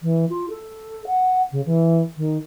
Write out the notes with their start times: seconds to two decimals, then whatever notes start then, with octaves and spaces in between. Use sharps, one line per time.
0.02 E3
0.29 F4
0.50 A4
1.06 F#5
1.52 C#3
1.65 E3
2.17 D#3